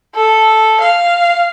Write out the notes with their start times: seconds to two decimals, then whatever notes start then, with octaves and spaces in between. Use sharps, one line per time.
0.16 A4
0.80 F5